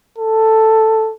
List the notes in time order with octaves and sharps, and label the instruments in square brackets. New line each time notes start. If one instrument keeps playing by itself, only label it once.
[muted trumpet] A4